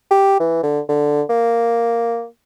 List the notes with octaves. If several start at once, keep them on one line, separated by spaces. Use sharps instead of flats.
G4
E3
D3
D3
A#3